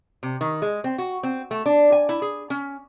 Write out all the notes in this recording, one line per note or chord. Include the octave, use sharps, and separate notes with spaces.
C3
D#3
G#3
C4
F#4
C4
A3
D4
G#5
E4
G#4
C#4